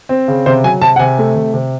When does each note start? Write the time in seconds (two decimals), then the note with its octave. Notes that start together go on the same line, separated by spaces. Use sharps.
0.09 C4
0.28 C#3
0.46 C3 C5
0.64 F#3 G#5
0.81 C3 A5
0.96 F#5
0.99 C3 G#5
1.19 A3
1.35 C3
1.54 C3